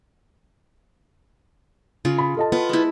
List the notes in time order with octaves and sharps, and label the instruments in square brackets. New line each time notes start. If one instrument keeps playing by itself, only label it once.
[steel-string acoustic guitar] C#3 [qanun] F4
[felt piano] B5
A4 D#5 A5
[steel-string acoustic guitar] B3 [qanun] F4
[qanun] G#3 E4